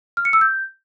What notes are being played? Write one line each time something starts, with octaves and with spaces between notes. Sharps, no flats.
F6
C#7
E6
G6